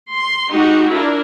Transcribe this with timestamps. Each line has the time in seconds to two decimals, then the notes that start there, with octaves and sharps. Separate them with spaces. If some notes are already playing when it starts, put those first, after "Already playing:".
0.12 C6
0.51 G#3 D#4 F#4 G4
0.89 D4 E4 F4 A#4